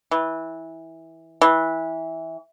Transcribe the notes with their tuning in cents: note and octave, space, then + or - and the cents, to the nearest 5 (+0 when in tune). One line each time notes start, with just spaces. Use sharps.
E3 -15
E3 -15